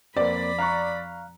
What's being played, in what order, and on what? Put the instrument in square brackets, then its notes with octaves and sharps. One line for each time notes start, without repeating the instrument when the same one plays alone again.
[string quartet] F2 B5 [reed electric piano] A#3 C4 [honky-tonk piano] D5
[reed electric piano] F5 F6 F#6 [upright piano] A#5 C#6